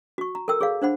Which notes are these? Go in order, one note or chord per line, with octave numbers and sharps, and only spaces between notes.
F#4 C#6
A#5
A4 A#4 G5 E6
G#4 C#5 F5
D4 C5 F#5 B5